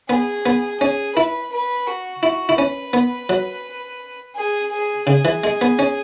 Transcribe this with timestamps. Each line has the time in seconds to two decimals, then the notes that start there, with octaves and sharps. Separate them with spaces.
0.09 B3 G#4
0.46 B3
0.80 C#4 G#4
1.16 E4 B4
1.52 B4
1.87 F#4
2.22 E4 F#4
2.49 E4
2.58 C#4 B4
2.93 B3
3.29 F#3
4.36 G#4
4.71 G#4
5.07 C#3 G#4
5.25 E3
5.44 G#3
5.61 B3
5.79 C#4